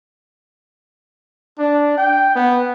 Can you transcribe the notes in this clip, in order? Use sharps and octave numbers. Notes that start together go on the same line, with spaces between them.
D4
G5
B3